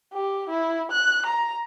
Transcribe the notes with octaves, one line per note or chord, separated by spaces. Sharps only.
G4
E4
F#6
A#5